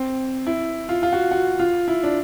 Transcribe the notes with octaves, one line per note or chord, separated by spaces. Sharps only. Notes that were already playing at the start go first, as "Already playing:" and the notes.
Already playing: C4
E4
F4
F4
F#4
F#4
F4
E4
D4